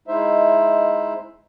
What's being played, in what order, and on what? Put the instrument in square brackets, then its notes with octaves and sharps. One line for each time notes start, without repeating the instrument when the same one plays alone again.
[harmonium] G#3 D#4 E4 C5 E5